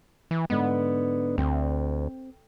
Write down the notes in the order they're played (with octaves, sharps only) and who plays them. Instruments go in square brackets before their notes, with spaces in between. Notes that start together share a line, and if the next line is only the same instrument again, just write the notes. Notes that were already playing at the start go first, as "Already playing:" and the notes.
[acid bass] E3
[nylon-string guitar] G#2 D3 [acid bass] B3
[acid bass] D2 [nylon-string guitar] C4